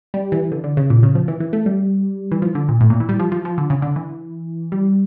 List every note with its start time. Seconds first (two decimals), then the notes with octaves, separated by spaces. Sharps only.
0.14 G3
0.32 E3
0.52 D3
0.64 D3
0.77 C#3
0.90 A#2
1.03 C#3
1.15 F3
1.28 E3
1.40 E3
1.53 A3
1.66 G3
2.31 E3
2.42 F3
2.55 D3
2.69 A#2
2.81 A2
2.90 A#2
3.00 E3
3.09 G3
3.19 F3
3.32 F3
3.45 F3
3.58 D3
3.70 C#3
3.82 D3
3.96 E3
4.72 G3